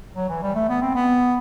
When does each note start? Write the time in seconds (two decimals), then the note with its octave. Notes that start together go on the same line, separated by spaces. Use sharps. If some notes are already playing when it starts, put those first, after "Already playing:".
0.15 F#3
0.29 E3
0.42 G3
0.55 A3
0.69 B3
0.81 C4
0.95 B3